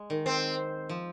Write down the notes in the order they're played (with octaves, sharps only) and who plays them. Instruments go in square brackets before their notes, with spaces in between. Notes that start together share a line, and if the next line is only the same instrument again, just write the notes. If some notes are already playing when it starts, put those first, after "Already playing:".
Already playing: [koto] G#3
D#3
[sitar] C4
[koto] F3